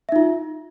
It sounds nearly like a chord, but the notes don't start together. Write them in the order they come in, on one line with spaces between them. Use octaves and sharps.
E5 D#4 F4